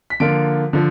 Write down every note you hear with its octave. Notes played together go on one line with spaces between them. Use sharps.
B6
D3 F3 A#3 F4 D7
D3 F3